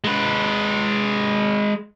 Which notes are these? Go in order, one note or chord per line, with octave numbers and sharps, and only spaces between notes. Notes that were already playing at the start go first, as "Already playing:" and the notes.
G#3 B4